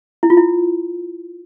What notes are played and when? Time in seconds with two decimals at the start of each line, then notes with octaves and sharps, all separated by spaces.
0.23 E4
0.30 F4
0.37 E4